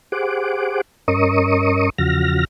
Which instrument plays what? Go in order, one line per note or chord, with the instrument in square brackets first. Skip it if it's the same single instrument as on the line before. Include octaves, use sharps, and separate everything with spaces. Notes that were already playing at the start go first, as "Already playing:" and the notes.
[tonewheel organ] G4 G#4 C5 F#5 D6
G2 C#4 A#4 D#5 C#6 D#6
E2 C#3 F3 F#4 F6 A#6